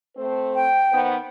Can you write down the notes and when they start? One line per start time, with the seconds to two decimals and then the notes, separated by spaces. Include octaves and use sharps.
0.17 A3 C4 C5
0.55 G5
0.92 D#3 B3 C5